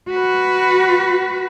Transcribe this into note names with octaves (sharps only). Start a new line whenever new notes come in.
F#4 B4